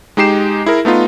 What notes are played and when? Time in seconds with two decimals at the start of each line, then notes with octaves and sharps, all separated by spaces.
0.17 G#3 D#4 G4 C7 E7
0.66 E4 G#4 A#4
0.85 A3 B3 D#4 F4